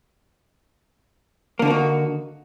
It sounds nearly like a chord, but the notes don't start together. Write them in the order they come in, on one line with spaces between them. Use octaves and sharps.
A#3 D3 D#4 D#3 F#4